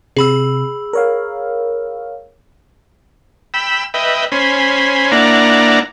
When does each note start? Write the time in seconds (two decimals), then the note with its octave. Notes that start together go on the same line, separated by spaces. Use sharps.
0.16 C3 G#4 B5 E6
0.93 A#4 C#5 F5
3.54 G5 B5 E6
3.94 B4 D#5 E5 G5
4.32 C#4 C5 G#5 B5
5.11 A#3 D4 E4 D5 F#5 A#5